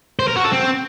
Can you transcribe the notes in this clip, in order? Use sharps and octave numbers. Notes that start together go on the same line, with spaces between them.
C5
A#4
F#4
A4
C4